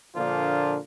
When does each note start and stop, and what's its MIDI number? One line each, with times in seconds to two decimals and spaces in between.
0.16 0.79 46
0.16 0.79 50
0.16 0.79 53
0.16 0.79 58
0.16 0.79 62
0.16 0.79 65